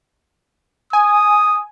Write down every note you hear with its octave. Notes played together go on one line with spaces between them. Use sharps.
G#5 D#6